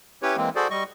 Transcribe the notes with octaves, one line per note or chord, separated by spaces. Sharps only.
C#4 E4 G4 B4 C#5
E3 G#3 A#3 C4
F#4 G#4 A4 C5 D5
G3 D#5 C#6